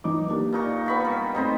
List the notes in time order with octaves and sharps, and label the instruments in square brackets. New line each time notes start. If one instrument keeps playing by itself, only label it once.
[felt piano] E3 D#4 D6
A#3 D4 G4
[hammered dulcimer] A#2 D#4 C#6
B3 B5 C#6
G3
[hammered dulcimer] G3 D#4 C5 [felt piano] A3 C4 D#5